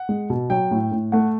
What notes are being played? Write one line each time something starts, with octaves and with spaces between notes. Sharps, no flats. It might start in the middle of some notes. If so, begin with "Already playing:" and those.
Already playing: F#5
G#3
B2
F#3 G5
A2
A2
A3 F#5